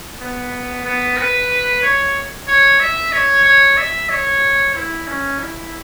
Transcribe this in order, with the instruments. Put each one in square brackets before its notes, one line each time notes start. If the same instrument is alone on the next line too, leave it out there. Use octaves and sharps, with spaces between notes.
[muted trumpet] B3
B3
B4
C#5
C#5
E5
C#5
C#5
E5
C#5
E4
C#4
E4